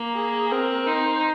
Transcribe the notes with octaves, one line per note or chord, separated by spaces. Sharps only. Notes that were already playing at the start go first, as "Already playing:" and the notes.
Already playing: A#3
G#4
C4 A#4
D#4 C5